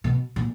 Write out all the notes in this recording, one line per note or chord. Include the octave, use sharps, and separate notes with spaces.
B2
A#2